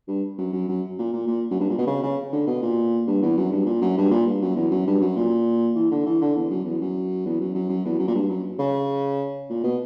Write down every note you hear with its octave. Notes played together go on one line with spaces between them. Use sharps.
G2
F#2
F#2
F#2
A#2
A#2
A#2
F#2
G2
A#2
B2
C#3
C#3
D3
B2
A#2
G2
E2
F#2
G2
A#2
F#2
G2
A#2
G2
F#2
E2
F#2
G2
F#2
A#2
E3
D3
E3
D3
E2
F#2
E2
F#2
E2
F#2
F#2
F#2
E2
F#2
A#2
G2
F#2
C#3
A#2
B2